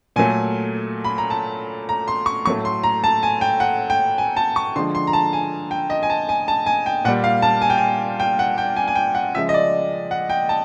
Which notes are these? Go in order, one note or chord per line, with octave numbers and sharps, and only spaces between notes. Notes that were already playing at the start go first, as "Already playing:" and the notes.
A#2 F#3 A3 G#5
B5
A#5
A5
A#5
C6
C#6
A2 F#3 A3 C#6
C6
A#5
A5
G#5
G5
F#5
G5
G#5
A5
C#6
D3 F3 G#3 C6
C6
A#5
A5
G#5
G5
D#5
G#5
A5
G#5
A5
G#5
G5
A#2 G3 F#5
F5
A5
G#5
G5
G#5
G5
F#5
G5
G#5
G#5
G5
F#5
C#3 F3 G#3 E5
D#5
D5
F#5
G5
A5